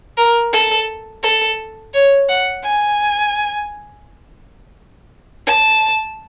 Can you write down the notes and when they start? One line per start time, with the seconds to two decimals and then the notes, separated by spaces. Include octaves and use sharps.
0.18 A#4
0.53 A4
1.23 A4
1.94 C#5
2.29 F#5
2.64 G#5
5.47 A5